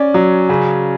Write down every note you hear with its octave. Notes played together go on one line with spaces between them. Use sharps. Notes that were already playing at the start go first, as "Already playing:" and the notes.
Already playing: C#4 D5
F#3
C#3